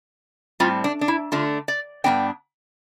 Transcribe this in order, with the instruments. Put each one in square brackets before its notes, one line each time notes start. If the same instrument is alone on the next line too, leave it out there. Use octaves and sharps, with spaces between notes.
[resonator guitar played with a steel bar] A2 G3 C4 F4
D4
D4
E4
D3 A3 D4 F4
D5
G2 E3 B3 D4 G5